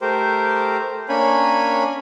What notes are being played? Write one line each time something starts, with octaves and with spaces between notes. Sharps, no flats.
A3 G4 A#4 C5
A#3 C#4 D4 C#5 G#5 B5